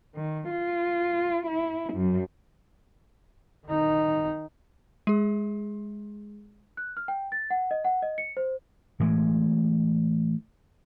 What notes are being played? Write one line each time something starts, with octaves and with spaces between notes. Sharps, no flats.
D#3
F4
E4
F#2
D#3 D#4
G#3 G#4
F#6
F6
G5
A6
F#5
D#5
F#5
D#5
C#7
C5
A2 E3 G#3